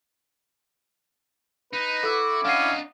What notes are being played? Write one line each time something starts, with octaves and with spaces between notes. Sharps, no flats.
D#4 B4
E4 F#4 A4 D6 E6
C#4 D4 D#5 F5 F#5 C7